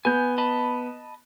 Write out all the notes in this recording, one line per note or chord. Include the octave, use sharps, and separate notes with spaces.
B3 G#5 G6
D#5 A5 B5